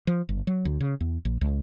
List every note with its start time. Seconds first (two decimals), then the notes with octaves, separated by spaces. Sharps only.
0.07 F3
0.29 G1
0.47 F#3
0.65 D2
0.80 C#3
1.01 E2
1.25 A#1
1.41 C#2